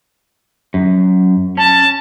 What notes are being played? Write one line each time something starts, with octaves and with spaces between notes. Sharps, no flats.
F#2
C#4 A5